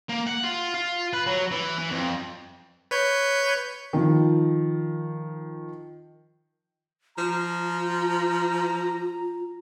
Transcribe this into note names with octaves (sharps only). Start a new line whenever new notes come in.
A#3
F#5
F4
F4
B4
F#3
E3
E3
F2
B4 C#5 G6
D#3 F3
F3 F4 A#5